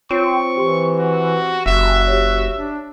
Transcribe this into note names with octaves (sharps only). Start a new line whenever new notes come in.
C4 F4 C#5 C#6 D7
E3 G4 C6
F#4
F#1 F#4 E5
G4 C#5
D4